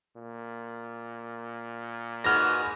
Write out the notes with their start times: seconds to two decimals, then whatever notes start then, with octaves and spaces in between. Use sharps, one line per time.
0.17 A#2
2.24 G#2 F#4 B4 D#5 F6 A#6